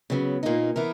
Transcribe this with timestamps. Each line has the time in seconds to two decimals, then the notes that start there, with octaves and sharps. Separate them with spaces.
0.10 C#3 F#3 B3
0.43 A#2 A#3 D#4
0.76 E3 B3 E4 A#4